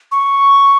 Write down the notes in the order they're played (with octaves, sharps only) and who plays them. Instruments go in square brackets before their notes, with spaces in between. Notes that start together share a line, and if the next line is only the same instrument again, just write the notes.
[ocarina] C#6